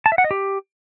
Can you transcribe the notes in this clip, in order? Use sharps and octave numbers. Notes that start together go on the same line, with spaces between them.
A5
E5
F#5
D#5
G4